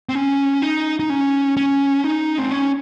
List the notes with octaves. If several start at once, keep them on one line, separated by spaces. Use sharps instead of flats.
C4
C#4
D#4
D#4
C#4
C#4
D#4
C4
C#4